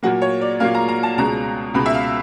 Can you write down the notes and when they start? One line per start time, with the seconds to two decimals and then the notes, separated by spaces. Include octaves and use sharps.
0.03 A#2 F#3 A#3 F#5
0.22 C#5
0.41 D5
0.60 A#2 F#3 A#3 F5
0.75 A#5
0.89 A#5
1.03 A5
1.18 C#2 B2 G#3 A#5
1.74 C#2 B2 G#3 B5
1.86 E5
1.94 F5